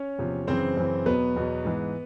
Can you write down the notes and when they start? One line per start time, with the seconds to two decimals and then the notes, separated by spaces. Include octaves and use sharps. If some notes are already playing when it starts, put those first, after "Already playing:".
Already playing: C#4 C#5
0.18 E2 C3 F3
0.47 F#2 C#3 E3 C4 C5
0.77 F#2 C#3 E3
1.06 E2 B2 F#3 B3 B4
1.36 E2 B2 F#3
1.64 G#2 E3